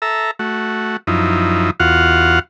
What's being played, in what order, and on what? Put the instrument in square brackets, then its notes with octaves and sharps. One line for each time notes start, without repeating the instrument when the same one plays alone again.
[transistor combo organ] A4 E5 A#5
A3 F#4
F#2 F3 D#4 E4
E2 F4 F#4 F5 F#5